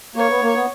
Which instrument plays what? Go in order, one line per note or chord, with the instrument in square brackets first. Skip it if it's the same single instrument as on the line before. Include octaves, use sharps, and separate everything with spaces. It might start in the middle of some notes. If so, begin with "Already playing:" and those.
[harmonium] A#3 [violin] C#5
[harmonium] B3
A#3
B3